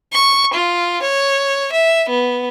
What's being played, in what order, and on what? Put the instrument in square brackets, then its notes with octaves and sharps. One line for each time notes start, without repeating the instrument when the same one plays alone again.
[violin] C#6
F4
C#5
E5
B3